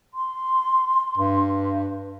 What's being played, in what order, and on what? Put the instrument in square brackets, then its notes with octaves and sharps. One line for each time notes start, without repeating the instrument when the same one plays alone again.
[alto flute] C6
[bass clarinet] G2